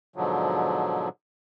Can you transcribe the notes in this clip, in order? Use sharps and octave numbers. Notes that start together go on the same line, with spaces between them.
G#2 B2 D3 F3 F#3